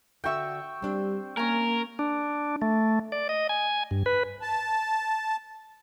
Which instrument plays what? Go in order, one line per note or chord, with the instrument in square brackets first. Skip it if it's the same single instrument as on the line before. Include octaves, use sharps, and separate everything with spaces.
[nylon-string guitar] D3 F#4 E5 [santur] G5 C#6 E6
[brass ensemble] G3 [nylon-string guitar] C4 D4
[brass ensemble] A#3 [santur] C#4 G#5 [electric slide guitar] A#4
[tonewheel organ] D4
A3
D5
D#5
G#5
G2
B4
[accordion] A5